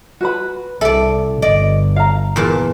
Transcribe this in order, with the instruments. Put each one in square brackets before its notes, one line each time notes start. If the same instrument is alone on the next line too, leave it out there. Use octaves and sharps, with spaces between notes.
[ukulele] F#4 B4 B5
[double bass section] C2 [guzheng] A4 D5 [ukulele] E5
[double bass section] G1 [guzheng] D5 [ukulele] D#5
[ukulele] F5 A#5
[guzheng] E2 A#2 A5